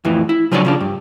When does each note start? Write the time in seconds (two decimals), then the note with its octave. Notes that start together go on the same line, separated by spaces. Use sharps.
0.05 F2 A2 E3
0.29 E4
0.51 C#3 F3 F#3 D4 C#5 D5
0.65 C#3 F3 D4
0.81 G2